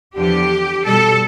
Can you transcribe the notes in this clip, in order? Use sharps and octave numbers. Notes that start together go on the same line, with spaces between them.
E2 D3 F3 G4
B2 G3 A4